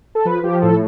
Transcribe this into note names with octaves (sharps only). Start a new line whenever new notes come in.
A4
F3 B4
F3 G4
A2 A4